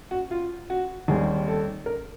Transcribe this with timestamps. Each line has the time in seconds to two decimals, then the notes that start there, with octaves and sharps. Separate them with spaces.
0.11 F#4
0.31 F4
0.70 F#4
1.08 D#2 D#3 G3 C4 G#4
1.48 A4
1.86 A#4